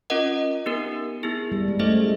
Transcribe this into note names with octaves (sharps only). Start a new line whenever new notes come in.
C#4 F4 A#4 D#5 F#5
B3 D#4 G4 A#4
B3 E4 G#4
G3
G#3
A3 C#4 E4 G#4 C5 D#5